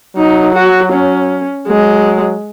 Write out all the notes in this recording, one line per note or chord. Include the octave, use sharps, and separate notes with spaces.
F#3 D#4
F#4
C#4
F#3 G#3